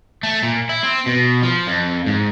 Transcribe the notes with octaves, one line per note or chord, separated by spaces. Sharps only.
A3
A#2
E4
C4
B2
F3
F2
G#2